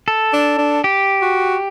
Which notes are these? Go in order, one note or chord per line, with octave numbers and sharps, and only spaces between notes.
A4
D4
D4
G4
F#4